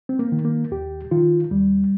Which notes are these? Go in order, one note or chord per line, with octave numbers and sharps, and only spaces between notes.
C4
A#3
D#3
A#3
D#2 G4
D#3 F4
D#2 G3